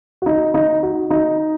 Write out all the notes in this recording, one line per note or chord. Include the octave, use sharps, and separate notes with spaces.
F#4
D#4
D#4
F#4
D#4